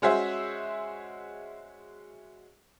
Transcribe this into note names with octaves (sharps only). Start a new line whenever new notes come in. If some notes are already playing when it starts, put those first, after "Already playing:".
G#3 C#4 F#4 G#4 C5 E5